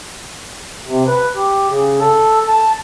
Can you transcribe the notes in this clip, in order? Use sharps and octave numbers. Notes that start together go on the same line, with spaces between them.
C3
B4
G4
C#3
A4
A5